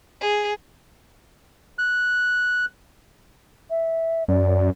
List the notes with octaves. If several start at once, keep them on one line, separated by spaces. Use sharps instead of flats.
G#4
F#6
E5
F#2 D5